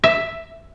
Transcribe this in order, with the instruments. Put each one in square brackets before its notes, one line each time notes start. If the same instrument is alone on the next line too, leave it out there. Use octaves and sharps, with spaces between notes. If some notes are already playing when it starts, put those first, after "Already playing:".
[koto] E5